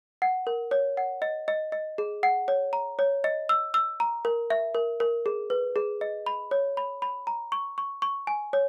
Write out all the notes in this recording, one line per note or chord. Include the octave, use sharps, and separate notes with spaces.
F#5
A#4
C#5
F#5
D#5
D#5
D#5
G#4
F#5
C#5
A#5
C#5
D#5
E6
E6
A#5
A#4
E5
A#4
A#4
G#4
B4
G#4
D#5
B5
C#5
B5
B5
A#5
C#6
C#6
C#6
G#5
C#5